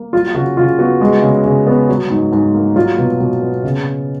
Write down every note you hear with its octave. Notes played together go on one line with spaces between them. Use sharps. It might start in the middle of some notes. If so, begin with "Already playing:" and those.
Already playing: A#3
F#3 F4
C#3 F#4
C#3 F4
B3 F#4
G#3
C#3
C#3
B3
F#3
G#2
G#2
A#3
F#3 F4
B2
B2
B3
C#3